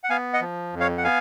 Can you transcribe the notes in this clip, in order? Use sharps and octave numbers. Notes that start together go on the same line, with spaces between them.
F#5
B3 F5 G#5
D#5 F#5
F3
F2
C#5 F5
F#5
B3 F5 G#5